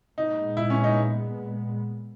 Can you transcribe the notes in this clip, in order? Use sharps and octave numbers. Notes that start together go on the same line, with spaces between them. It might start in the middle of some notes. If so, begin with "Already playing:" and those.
A#2 G#3 B3 D#4
E4
C#4
D#4